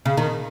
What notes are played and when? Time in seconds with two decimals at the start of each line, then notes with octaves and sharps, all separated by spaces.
0.05 C#3
0.17 D#3